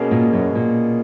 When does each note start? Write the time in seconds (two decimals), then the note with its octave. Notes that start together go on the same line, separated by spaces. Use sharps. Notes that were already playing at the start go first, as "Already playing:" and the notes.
Already playing: B2 A#3 C#4 G#4
0.11 A#2
0.33 F#2
0.55 A#2